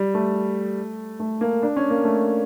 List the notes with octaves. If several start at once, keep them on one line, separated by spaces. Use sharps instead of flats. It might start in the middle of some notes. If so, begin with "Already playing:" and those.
Already playing: G3
A3
A3
A#3
D4
C#4
A#3
A3